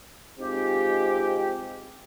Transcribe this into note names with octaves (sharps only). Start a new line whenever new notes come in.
G#3 C4 D#4 F4 G4